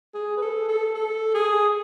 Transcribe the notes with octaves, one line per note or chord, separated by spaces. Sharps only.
G#4
B4
A4
A4
A4
G#4